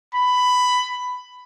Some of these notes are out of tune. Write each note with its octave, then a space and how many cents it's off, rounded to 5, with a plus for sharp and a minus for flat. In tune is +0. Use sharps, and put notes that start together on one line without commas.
B5 +10